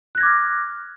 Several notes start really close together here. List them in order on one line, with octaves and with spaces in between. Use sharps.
F#6 A#6 G#6 D6 F6